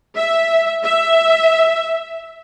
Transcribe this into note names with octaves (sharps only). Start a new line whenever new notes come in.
E5
E5